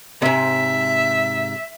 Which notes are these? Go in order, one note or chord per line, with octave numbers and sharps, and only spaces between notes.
G#2 C3 E5